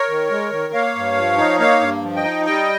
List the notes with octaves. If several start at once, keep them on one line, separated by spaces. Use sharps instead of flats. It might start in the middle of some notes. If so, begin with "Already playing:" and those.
Already playing: A#4 C#5
D#3
G#3
D#3
A#3 C#5 F5
G2
F3
D#4
A#3 C#5 F5
G2
F3
D#5 G5
D#4
G3 D#5 G5